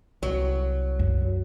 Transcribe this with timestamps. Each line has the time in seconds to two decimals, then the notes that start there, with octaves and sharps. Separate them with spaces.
0.23 C2 F#3
0.99 F#2